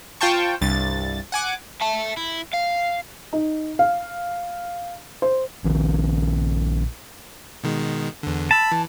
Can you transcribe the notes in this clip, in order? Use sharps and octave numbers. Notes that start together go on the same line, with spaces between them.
F4 C5 G5 A5 C#6
C2 G2 A6
F#5 G#5 D6
E5 A5
E4
F5
D#4
F5
C5
A#1 D#3
B2 D#3 G#3
E2 D3
A5 B5 E6
E3